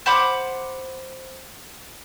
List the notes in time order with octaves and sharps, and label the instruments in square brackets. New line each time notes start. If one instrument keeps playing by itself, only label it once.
[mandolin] C5 F#5 B5 D6